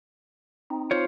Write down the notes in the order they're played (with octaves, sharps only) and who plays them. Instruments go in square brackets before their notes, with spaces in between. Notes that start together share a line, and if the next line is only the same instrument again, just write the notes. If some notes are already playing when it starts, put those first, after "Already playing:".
[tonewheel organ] C4 D#4
[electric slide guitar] F4 C5 C#5